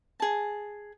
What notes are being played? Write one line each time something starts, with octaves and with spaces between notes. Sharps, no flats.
G#4 A5